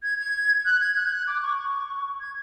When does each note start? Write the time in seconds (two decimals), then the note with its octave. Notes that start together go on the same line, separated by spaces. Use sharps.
0.03 G#6
0.19 G#6
0.66 F#6
0.81 G#6
0.96 F#6
1.06 G#6
1.12 F#6
1.27 D6
1.43 C#6
1.59 C#6
2.20 G#6